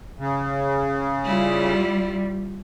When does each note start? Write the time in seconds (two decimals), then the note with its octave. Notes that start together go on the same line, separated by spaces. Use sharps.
0.19 C#3
1.25 G3 E4 F4